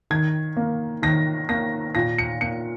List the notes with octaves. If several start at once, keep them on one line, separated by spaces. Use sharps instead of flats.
D#3 G#6
A#3
D#3 A#6
A#3 A#6
A#2 A#6
C#7
A#3 C#7